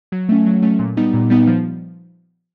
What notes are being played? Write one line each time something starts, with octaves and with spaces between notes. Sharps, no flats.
F#3
A3 C#4
F#3
A3 C#4
A#2
G3 B3 D#4
A#2
G3 B3 D#4
F3